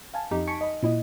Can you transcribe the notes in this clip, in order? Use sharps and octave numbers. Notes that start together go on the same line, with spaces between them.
F5 G#5 A5
F2 D#4 G4
G#5 A5 C#6 B6 C#7 D7
D#5 B5
A#2 E4 D#5